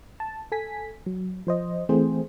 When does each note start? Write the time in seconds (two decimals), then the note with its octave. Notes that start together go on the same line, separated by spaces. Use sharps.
0.20 A5
0.52 A4 G#5 B6
1.06 F#3
1.47 F3 C5 D#5
1.89 E3 A3 C4 G#4 C5